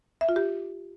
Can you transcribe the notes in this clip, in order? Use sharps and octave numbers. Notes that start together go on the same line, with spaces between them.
E5
F4
G4